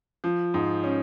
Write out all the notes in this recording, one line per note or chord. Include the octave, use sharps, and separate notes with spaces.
F3
G#2
C#4